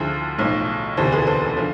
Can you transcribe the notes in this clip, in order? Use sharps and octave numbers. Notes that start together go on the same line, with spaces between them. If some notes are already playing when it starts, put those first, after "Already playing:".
Already playing: D2 D3 F3 E4 G#4
B1 A2 F3
E1 D2 C3 E3 A4 C5
G#4 B4
A4 C5
D3 F3